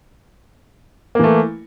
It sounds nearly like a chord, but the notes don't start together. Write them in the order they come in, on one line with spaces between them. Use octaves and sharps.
A#3 E3 A3